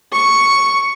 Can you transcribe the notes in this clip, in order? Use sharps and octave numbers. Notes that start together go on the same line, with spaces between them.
C#6